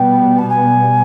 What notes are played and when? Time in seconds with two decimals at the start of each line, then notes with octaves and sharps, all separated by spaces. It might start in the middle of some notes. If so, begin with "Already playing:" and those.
Already playing: B2 G3 B3 G5
0.38 A5
0.49 G#5